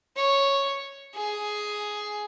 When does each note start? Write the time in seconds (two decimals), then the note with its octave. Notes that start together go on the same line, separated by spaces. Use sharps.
0.16 C#5
1.15 G#4